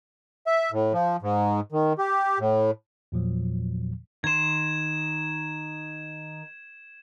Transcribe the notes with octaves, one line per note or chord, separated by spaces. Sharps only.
E5
A2
F3
G#2
D#3
G4
A2
E2 A#2 F3 F#3
D#3 C6 G#6 E7